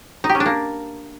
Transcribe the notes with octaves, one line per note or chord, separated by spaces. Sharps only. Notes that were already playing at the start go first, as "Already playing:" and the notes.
D#4
G4
C#4
D4
A#3